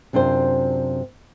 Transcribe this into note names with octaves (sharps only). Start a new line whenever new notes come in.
F#2 C3 D4 F4 C5